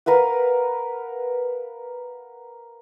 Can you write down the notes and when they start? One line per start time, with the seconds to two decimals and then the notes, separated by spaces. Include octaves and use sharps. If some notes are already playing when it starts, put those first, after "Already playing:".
0.06 A#4 B4 F5 F#5